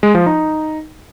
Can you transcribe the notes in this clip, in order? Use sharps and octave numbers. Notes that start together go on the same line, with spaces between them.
G#3
F3
D#4